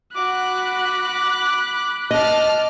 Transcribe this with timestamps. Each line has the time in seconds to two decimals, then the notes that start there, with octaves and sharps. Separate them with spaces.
0.15 F#4 B5 D6 F#6
2.11 D#5 A5 D6 F6